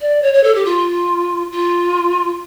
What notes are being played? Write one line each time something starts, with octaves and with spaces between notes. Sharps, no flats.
D5
C#5
C#5
A4
G4
F4
F4